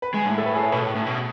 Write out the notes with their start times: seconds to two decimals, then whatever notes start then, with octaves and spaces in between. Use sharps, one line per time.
0.02 B4
0.14 G#3
0.26 A2
0.38 A4
0.46 B4
0.55 G#4
0.63 C#5
0.72 B2 B4
0.83 A2
0.95 A2
1.06 B2